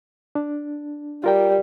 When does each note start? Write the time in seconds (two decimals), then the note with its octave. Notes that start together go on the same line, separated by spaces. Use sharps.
0.35 D4
1.24 G3 F4 A#4 G5